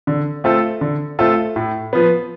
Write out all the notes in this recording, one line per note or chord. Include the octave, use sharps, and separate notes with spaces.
D3
A3 C4 F4 A4
D3
A3 C4 F4 A4
A2
F3 B3